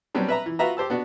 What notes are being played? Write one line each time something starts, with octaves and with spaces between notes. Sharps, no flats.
F#3 G3 B3 C4 D4
B4 E5 A#5
E3
F4 F#4 B4 E5 A#5
G4 C5 A5 E6
B3 D4 F#4